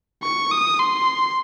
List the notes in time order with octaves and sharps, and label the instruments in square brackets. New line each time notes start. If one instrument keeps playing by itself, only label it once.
[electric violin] C#6
D#6
C6